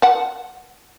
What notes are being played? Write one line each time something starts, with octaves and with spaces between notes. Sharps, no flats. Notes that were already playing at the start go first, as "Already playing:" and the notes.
F#5 A5